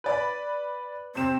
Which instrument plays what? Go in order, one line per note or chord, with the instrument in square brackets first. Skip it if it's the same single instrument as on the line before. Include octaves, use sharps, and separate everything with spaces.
[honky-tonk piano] B4 D5 B5
[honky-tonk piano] C3 E7 [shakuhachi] C4